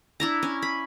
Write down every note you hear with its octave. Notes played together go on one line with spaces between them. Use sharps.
D4 E4 A#5
C#4
B5